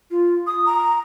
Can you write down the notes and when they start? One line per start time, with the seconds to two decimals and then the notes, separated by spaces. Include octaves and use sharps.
0.11 F4
0.47 D#6
0.66 A#5